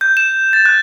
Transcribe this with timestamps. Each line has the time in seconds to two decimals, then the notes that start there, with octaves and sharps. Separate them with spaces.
0.01 G6
0.17 E7
0.53 A6
0.66 F#6